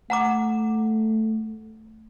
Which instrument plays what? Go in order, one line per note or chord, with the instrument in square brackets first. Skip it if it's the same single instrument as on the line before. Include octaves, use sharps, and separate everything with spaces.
[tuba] A3 [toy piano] F#5 A#5 D6